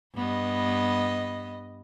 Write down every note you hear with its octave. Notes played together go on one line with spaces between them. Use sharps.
G2 B3 D#5